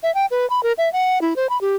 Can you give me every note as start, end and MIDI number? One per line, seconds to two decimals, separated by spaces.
0.03 0.13 76
0.15 0.26 79
0.31 0.48 71
0.50 0.63 83
0.63 0.72 70
0.78 0.91 76
0.93 1.21 78
1.22 1.34 64
1.36 1.47 72
1.50 1.60 83
1.61 1.76 67